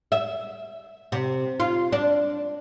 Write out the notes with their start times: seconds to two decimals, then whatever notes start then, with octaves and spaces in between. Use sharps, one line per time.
0.12 E5
1.12 C3
1.60 F4
1.92 D4